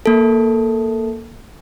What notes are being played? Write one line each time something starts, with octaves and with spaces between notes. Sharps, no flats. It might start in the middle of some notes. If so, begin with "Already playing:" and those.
A#3 A4